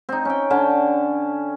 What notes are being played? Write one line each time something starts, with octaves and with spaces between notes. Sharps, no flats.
C4 D#4
C#4 G5
D3 C#4 A5